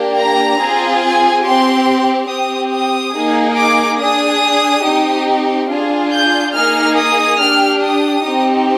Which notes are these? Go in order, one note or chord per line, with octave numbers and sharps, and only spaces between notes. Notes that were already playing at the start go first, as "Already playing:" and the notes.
Already playing: A#3 D4 G4
A#5
C4 F4 G#4
G#5
C4 G4 C6
C4 G4 D#6
D#6
A#3 D#4 G#4
D6
D4 G#4 D#6
C4 D#4 G4
D4 F4 G#4
G6
A#3 D#4 G#4 F6
D#6
D4 G4 F6
D#6
C4 D#4 G4